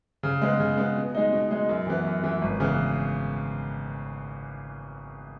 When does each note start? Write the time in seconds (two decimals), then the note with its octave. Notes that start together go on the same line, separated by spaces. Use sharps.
0.23 C#3
0.42 G#3 B3
0.60 C#3
0.78 G#3 B3
0.96 B2
1.15 G#3 D#4
1.33 B2
1.51 G#3 D#4
1.69 F#2
1.87 E3 B3
2.05 F#2
2.23 E3 B3
2.42 G#1
2.60 C#3 E3 B3